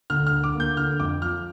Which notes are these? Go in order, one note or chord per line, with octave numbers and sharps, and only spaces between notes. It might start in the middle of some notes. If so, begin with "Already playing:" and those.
D2 F6
F6
D2
D6
A#3
G6
D3 F6
F2 D6
F3 F6